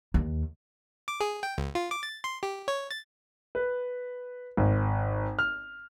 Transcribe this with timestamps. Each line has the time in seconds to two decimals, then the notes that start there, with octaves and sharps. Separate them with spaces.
0.14 D#2
1.08 D6
1.20 G#4
1.43 G5
1.58 C#2
1.75 F4
1.91 D6
2.03 A6
2.24 C6
2.43 G4
2.68 C#5
2.91 A6
3.55 B4
4.57 G#1
5.39 F6